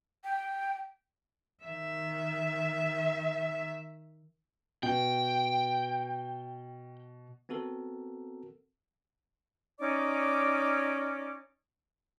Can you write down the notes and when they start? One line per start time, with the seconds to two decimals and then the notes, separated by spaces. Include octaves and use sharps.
0.24 G5
1.64 D#3 E5
4.83 B2 G5
7.49 B3 C4 F#4 A4 A#4
9.79 C#4 D#4 D5 D6